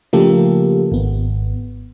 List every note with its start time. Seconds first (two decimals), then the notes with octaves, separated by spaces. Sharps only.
0.13 C#3 F3 A3 A#3 G4 A4
0.92 G#1 B3